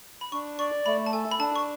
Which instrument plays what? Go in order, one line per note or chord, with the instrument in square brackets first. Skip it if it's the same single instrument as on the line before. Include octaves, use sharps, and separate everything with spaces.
[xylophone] B5
[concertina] D4 [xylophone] C#6
[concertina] D5 [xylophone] C#6
[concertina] A3 [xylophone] B5
[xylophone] A5
[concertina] A4 [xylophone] G#5
[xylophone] B5
[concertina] D4 [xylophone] A5
[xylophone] C#6